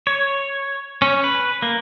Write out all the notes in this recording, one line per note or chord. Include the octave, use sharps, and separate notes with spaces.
C#5
C#4
B4
A#3